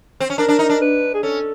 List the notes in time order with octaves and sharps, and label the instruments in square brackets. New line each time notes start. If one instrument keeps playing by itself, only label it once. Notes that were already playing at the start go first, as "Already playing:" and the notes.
[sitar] C4
C#4
[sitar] D4 [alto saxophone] A#4
[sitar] D4
D#4
D4
[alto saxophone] B4
G#4
[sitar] C#4 [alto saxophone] A4